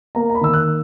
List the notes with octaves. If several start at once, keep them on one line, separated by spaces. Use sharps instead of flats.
A#3 A#5
A#5
B5
D#3 E6
F#6